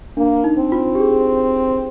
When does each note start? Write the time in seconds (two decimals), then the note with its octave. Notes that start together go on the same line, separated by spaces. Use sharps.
0.17 A#3 D4
0.44 D#4
0.58 C4
0.72 F4
0.95 G4
1.00 G#4